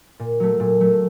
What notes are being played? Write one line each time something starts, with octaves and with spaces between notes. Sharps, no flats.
A#2
F#3 A3
A#2
F#3 A3